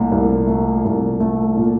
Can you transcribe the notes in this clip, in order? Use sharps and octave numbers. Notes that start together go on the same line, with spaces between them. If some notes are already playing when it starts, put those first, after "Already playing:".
Already playing: C2 A#2 A3
C2
A3
C2
A3
A#2